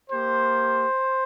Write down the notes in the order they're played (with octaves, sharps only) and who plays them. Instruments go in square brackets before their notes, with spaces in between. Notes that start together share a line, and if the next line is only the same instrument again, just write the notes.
[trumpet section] A#3 G4 C5